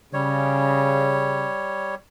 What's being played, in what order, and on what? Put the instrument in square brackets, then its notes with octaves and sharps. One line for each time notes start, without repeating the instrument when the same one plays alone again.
[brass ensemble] C#3 [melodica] G3 C#5